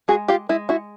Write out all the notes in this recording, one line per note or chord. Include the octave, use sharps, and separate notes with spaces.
G#3 F#4 G#4
F4 G4
G#3 E4
E4 F#4